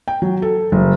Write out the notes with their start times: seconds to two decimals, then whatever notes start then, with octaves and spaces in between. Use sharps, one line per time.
0.08 G5
0.22 F#3
0.42 A4
0.72 F#1